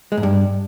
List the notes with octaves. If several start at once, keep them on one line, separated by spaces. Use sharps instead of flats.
G#3
G#2
G2